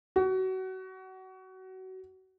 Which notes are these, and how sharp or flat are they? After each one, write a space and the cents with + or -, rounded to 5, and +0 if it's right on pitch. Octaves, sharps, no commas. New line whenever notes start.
F#4 +25